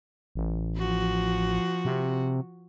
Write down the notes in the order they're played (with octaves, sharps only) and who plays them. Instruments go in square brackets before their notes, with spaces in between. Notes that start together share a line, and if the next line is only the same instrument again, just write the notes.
[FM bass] A1
[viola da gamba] F3 F#4
[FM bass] C3